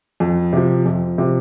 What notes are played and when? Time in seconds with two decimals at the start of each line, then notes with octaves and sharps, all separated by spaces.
0.20 F2
0.53 C3 F3
0.85 F2
1.18 C3 F3